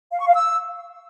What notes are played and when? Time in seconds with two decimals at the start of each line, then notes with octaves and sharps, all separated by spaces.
0.12 F5
0.20 C#6
0.27 F5
0.34 E6